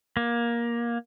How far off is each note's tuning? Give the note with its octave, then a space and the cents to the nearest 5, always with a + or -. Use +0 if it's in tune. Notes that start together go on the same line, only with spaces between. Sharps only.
A#3 +20